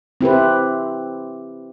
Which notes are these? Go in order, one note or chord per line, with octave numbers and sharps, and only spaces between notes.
C4 E4 G4 B4